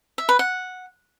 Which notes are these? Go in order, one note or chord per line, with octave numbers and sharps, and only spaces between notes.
E5
B4
F#5